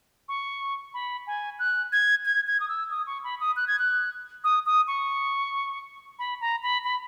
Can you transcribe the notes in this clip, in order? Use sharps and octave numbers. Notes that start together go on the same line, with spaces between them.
C#6
B5
G#5
F#6
G#6
G#6
G#6
D#6
E6
D#6
C#6
B5
D#6
F#6
G#6
F#6
D#6
D#6
C#6
B5
A#5
B5
B5